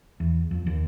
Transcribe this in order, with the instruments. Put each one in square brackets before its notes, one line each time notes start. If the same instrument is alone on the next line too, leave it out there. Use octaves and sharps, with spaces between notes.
[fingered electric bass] E2
F2
D#2